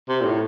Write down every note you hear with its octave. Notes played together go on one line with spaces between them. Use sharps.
C3
A#2
A2